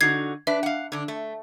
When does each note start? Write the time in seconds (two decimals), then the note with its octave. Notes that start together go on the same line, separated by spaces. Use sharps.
0.01 D3 D#4 F#4 G#6 C7
0.47 D4 B4 E5
0.63 F5 F#5
0.92 D3 D4
1.08 A3